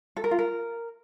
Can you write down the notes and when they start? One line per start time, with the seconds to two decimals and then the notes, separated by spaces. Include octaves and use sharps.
0.16 A4
0.24 A#4
0.31 F4
0.39 A#4